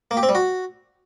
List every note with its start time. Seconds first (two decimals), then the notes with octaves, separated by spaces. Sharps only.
0.11 A#3
0.17 G4
0.23 C4
0.29 G3
0.35 F#4